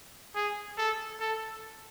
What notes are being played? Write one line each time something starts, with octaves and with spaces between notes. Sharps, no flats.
G#4
A4
A4